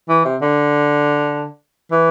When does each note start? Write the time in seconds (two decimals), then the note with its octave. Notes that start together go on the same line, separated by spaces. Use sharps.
0.09 E3
0.25 C3
0.42 D3
1.92 E3